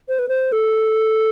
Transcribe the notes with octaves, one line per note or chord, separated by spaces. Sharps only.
C5
B4
C5
A4